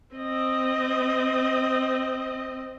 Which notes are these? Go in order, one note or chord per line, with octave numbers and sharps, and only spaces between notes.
C4 D#5